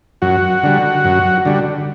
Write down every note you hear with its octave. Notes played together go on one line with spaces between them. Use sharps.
F#2 F#4
D3 G3
F#2
D3 G3